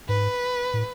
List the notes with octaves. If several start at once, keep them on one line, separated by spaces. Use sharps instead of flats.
G#2 B4
A2